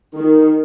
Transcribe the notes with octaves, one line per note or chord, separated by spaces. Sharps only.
D#3